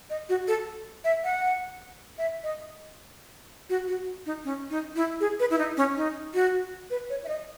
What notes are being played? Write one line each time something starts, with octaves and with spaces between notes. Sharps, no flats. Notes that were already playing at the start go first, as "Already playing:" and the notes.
D#5
F#4
A4
E5
F#5
E5
D#5
F#4
F#4
D#4
C#4
D#4
E4
G#4
B4
E4
D#4
C#4
D#4
F#4
B4
C#5
E5
D#5